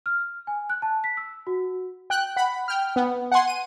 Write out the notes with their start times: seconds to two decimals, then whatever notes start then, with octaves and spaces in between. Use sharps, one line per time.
0.06 F6
0.47 G#5
0.70 F#6
0.82 A5
1.04 B6
1.17 E6
1.47 F#4
2.10 G5 F#6
2.36 F#5 B5
2.68 G5 F6
2.96 B3
3.32 F#5 G#5 C6
3.48 D#7